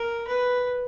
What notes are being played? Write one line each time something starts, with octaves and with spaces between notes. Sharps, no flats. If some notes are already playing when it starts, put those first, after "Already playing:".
Already playing: A#4
B4